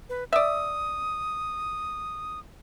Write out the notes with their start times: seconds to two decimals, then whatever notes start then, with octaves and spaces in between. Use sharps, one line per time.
0.09 B4
0.33 D5 E5 D#6